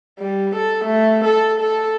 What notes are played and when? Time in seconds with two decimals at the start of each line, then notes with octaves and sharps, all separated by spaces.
0.19 G3
0.55 A4
0.85 A3
1.25 A4
1.60 A4